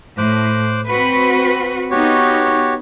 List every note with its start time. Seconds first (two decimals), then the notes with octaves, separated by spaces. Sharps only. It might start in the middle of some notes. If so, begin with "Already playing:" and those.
0.18 A2 C5 D6 F#6
0.89 C4 F#4 B4 B5
1.91 B3 D#4 F#4 G4 C#5